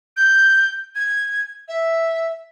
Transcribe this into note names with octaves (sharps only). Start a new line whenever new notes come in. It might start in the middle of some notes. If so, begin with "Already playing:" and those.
G6
G#6
E5